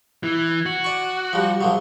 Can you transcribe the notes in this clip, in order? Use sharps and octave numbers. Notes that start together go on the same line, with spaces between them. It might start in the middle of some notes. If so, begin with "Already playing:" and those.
E3
F#4
D5 C#6
F3 G3
A#1 F3 F#3